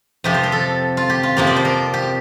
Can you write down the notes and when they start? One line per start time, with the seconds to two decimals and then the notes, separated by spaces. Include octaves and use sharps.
0.24 F2 C3 F3 G4
0.34 C5
0.43 A#4
0.52 A4
0.97 F4
1.10 G4
1.23 F4
1.37 F2 C3 F3 A#3 G4
1.47 D5
1.56 C5
1.65 A#4
1.94 G4